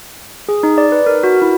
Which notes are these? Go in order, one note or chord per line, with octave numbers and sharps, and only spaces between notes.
G#4
D#4
D5
B4
A#4
F#4
E4